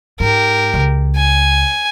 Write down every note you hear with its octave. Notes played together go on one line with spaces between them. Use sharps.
G#2 G4 A#4
C#2
G#5